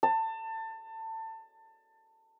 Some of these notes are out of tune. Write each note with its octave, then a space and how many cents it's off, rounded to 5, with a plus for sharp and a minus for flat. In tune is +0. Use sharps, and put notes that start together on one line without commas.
A5 +25